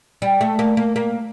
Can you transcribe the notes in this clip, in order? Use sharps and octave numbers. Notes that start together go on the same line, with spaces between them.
G3
A3
A#3
A#3
A#3